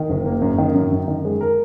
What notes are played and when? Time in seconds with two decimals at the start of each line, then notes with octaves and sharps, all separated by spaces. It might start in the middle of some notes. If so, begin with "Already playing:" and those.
Already playing: D#3
0.10 F#1
0.26 A#3
0.42 F#2
0.58 D#3
0.74 F#2
0.92 F#2
1.08 D#3
1.25 G#3
1.41 A#4